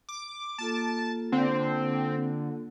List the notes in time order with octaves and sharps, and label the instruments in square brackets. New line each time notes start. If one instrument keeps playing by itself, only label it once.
[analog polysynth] D6
[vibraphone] A#3 F4 A4 [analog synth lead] A5
[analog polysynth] D3 [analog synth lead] C4